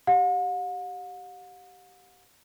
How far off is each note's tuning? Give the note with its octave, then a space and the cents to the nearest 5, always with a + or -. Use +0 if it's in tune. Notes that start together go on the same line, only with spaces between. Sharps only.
G4 -10 F#5 -45